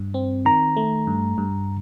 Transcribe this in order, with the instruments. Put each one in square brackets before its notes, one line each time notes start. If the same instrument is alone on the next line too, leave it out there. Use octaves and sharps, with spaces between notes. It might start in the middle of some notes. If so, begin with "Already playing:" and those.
Already playing: [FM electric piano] G2
C4
[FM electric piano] D#3 [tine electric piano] A#5
[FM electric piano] A3
G2
G2